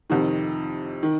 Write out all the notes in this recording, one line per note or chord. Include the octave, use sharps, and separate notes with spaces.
F2 C3 D#3
D#3